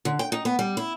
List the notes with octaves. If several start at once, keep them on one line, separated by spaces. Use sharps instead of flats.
D3
G5
D#4
B3
G3
E4